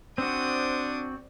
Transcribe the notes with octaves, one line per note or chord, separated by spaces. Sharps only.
C4 D4 F#4 C5 D5 D#6